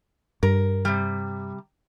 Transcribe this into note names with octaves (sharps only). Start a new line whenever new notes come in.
G2 A#4
C3 G3